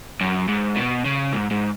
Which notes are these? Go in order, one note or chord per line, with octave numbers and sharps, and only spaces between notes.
F#2
G#2
B2
C#3
G#2
G#2